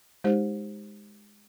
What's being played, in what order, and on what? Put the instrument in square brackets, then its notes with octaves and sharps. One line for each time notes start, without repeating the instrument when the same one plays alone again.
[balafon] G#3 D#4 G4 C5